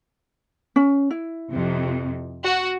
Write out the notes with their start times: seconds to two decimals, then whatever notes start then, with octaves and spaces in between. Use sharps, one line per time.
0.76 C#4
1.11 E4
1.51 F2 C3
2.43 F#4